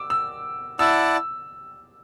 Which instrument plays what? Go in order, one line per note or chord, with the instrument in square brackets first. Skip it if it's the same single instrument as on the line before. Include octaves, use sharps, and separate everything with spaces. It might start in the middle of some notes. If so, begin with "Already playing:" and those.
Already playing: [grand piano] D6 E6
E6
[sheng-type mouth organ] E4 D5 F#5 A5 [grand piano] E6